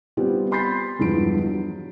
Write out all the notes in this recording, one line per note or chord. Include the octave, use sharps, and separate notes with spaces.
G3 B3 C4 F4 G4
B5 C6 G6 A6 B6 C7
E2 G2 F3 G#3 D7
F#3